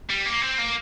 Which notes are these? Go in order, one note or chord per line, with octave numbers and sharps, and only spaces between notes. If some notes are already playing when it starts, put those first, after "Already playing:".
G3
A#3
C4
A#3